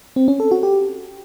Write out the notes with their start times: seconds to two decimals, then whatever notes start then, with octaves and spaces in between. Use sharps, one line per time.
0.16 C4
0.28 C#4
0.40 A4
0.51 F#4
0.63 G4